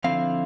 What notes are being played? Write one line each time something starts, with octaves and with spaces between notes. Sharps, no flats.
D3 F3 C4 E4 F5